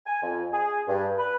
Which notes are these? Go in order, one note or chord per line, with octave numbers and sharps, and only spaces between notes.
G#5
F2
G#4
G2
B4